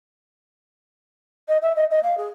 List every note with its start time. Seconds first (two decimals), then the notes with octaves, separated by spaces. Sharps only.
1.48 D#5
1.62 E5
1.76 D#5
1.91 D#5
2.03 F5
2.18 G#4